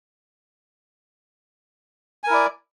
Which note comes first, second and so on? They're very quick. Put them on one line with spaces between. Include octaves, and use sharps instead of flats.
G#5 A#4 E4 D5